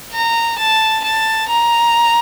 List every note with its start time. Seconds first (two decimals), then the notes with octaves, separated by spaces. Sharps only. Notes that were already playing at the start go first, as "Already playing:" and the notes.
0.13 A#5
0.58 A5
1.04 A5
1.49 A#5